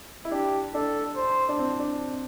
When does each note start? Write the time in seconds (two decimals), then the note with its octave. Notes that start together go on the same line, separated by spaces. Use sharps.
0.25 E4
0.31 D4 G4
0.74 D4 A4
1.16 C5
1.49 D4
1.59 C4
1.79 D4